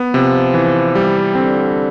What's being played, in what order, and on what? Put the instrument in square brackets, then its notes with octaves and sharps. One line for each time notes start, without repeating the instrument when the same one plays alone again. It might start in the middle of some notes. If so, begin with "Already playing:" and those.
Already playing: [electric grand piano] B3
[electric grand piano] C3 [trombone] F3
[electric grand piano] E3
G3
[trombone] D3 [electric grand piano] C4